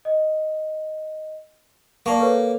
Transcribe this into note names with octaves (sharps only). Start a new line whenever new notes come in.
D#5
A#3 D5 A5 C#6
A4 B4 C#5